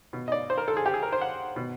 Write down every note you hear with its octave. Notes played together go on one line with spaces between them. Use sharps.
B2
D#5
D5
C5
A#4
A4
G#4
G4
G#4
A#4
C5
F#5
B2